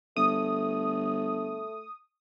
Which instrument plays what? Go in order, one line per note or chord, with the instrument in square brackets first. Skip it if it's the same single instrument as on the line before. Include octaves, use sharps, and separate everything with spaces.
[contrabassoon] G1 [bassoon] A3 [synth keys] D#6